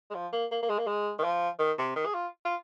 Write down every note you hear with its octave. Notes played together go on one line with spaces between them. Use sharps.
G#3
F3
A#3
A#3
A#3
G#3
A#3
G#3
D#3
F3
D#3
C3
D#3
G#4
F4
F4